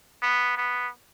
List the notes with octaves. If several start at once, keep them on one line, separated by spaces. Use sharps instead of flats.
B3
B3